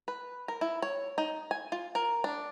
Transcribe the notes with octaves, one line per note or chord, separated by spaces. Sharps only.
B4
A#4
E4
C#5
D#4
G#5
F4
A#4
D4